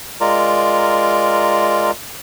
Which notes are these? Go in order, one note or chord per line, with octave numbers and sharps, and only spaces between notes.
G#3 F4 A#4 D5 A#5